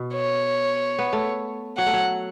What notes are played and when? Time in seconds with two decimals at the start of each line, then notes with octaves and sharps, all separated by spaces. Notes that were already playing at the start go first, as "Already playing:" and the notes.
Already playing: B2
0.15 C#5
0.99 B3
1.13 A3
1.77 F#3 F#5
1.86 A3
1.94 F#3